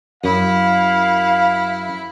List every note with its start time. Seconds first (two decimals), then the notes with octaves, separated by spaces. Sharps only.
0.24 F#2 E4 F5